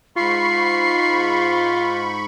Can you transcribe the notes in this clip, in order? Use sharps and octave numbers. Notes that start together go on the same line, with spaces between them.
G#2 F4 B5 C#6 C7